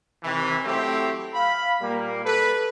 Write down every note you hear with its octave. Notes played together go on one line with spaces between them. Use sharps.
C3 D#3 E3
F#3 A3 C4 E4 G4
F5 B5
A#2 G3 A#3
A4 B4